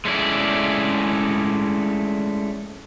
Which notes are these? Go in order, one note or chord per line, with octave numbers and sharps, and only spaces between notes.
G#3 A3 C#4 E4 D5